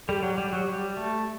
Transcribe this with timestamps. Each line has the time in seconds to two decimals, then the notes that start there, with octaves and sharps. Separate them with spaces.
0.08 G3 G4 A4
0.23 F#3
0.38 G3
0.53 F#3
0.68 G3
0.97 A3